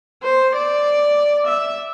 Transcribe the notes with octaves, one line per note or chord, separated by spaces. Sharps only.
C5
D5
E5